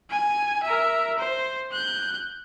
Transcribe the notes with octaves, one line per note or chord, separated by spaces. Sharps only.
G#5
A#4 E5
C5
F#6 G6